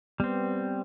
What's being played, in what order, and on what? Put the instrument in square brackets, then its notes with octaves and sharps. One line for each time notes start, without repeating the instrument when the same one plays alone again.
[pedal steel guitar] G3 C4 [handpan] B3